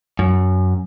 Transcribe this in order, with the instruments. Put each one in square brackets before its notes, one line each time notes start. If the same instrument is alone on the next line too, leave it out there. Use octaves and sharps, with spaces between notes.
[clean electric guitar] F#2